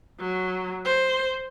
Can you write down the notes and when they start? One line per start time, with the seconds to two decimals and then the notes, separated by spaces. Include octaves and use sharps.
0.20 F#3
0.85 C5